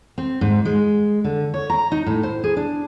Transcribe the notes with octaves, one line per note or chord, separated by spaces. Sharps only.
C4
G#2
G#3
D3
C#5
A#5
D#4
A2
C5
G#4
D4